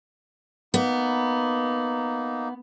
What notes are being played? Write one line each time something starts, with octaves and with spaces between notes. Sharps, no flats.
A#3 B3 D#4